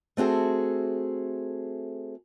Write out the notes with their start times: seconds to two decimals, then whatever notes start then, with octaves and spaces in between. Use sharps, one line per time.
0.17 A3 C4 F#4 G#4 A4